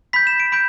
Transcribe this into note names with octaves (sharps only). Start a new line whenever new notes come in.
B5 G6 B6
E7
D7
B5 G6 D7